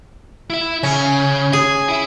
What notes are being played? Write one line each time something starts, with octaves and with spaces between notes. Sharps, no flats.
E4 E5
C#3 C#4
G#4 G#5
E4 E5